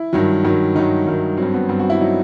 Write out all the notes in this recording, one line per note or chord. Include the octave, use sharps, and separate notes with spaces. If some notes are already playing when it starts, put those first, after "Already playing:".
Already playing: E4
G2 D#3 F#3
G2 D#3 F#3
G2 D#3 F#3 D#4
G2 D#3 F#3
F#3 C4
G2
B3
G2 F#3 C4
F#4
E4
F#3 D#4